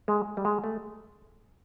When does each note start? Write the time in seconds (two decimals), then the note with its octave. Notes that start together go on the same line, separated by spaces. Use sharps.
0.08 G#3
0.37 G3
0.45 G#3
0.64 A3